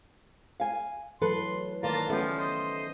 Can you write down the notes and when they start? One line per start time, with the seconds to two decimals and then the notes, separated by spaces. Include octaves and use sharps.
0.60 F5 G#5
1.22 E3 F#3 A3 A4 B4 C6
1.83 D#3 A#3 F4 B4 D5 A5 A#5
2.09 F3 A3 B3 C#4 F4 G4
2.38 C5 D#5